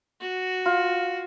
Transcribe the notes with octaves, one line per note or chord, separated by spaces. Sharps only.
F#4
F4